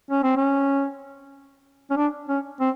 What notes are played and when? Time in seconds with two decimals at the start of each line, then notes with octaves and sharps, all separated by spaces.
0.11 C#4
0.23 C4
0.37 C#4
1.91 C#4
1.97 D4
2.29 C#4
2.60 C4